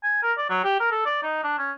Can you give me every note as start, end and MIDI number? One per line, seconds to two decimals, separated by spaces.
0.03 0.20 80
0.23 0.32 70
0.38 0.46 74
0.50 0.60 54
0.64 0.78 67
0.80 0.91 70
0.91 1.06 69
1.06 1.23 74
1.23 1.41 63
1.43 1.57 62
1.59 1.72 61